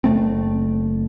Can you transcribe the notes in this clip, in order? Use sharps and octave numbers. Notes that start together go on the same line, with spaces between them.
F#1 A3 C4